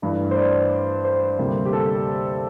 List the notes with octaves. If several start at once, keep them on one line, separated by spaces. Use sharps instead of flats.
G2 E3 A3
C5
D5
C5
D2 C3 G3 A#3
G4
A4